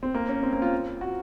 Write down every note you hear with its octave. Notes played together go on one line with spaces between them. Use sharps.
C4
A#3
C#4
C4
A#3
F4
F#4